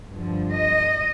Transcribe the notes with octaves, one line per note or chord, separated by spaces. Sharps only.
G2 D3 F3
D#5